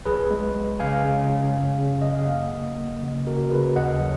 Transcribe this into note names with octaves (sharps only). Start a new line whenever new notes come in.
B1 G#4 B4
G#3
G#3
C#3 F5 G#5
C#3
C#3
F#2
C#3
F#3 D#5
F5
A#3 D#5 F#5
A#3
A#3
C#3
C#3 F#4 A#4
C#3 G#4 B4
D#2 D#5 F#5
F#3